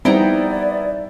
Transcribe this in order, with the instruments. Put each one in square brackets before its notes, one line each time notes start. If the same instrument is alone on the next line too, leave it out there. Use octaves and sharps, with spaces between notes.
[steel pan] G3 C4 [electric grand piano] B3 E4 [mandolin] D#4 G5 A#5 [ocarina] D5